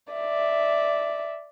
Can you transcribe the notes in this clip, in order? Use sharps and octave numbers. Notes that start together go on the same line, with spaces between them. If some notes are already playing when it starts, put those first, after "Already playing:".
D5 E5